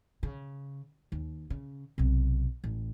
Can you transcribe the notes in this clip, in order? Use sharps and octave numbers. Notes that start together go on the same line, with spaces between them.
C#3
D#2
C#3
B1 C3
A1